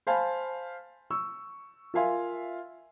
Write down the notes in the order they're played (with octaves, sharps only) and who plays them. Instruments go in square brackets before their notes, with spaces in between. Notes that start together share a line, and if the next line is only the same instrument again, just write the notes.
[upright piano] C5 F5 G#5 A5 B5
C#6 E6
F4 A#4 E5 F5 G#5 C6